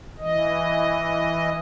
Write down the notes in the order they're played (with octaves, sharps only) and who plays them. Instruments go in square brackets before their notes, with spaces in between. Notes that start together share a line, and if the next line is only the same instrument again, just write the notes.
[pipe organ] E3 D#5